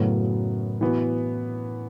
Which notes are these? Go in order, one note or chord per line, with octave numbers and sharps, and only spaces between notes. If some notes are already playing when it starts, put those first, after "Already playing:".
Already playing: F#2 A2 C#3 F#3 B3 F#4
E3 B3 F#4